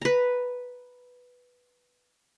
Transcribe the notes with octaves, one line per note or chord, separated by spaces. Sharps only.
B4 A#5